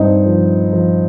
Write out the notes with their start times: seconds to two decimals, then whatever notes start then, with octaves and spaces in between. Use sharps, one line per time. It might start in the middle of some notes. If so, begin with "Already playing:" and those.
Already playing: G2 C4 D#4
0.26 F3
0.73 F3